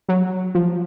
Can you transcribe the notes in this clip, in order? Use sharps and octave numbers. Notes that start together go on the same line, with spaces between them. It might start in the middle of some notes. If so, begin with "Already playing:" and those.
F#3
F3